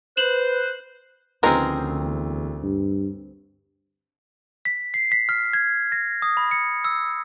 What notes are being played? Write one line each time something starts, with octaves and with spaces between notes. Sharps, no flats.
B4 C5 F#6 E7 F#7
D2 C#3 F3 B3 C4 D#4 G#4 A#4
E2
G2
B6
C7
B6
F6
G#6
A#6
D#6
B5
C#7
E6